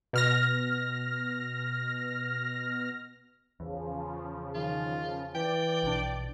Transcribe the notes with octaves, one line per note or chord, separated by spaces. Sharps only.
B2 F6 A#6
E2 C#3 F3
D#3 F4
E3 D5 G5
A#1 B2 D4